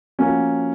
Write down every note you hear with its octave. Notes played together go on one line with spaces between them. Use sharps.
F3 A#3 C#4 F#4